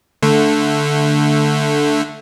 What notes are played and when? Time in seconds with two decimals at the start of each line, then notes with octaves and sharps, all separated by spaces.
0.23 D3 A3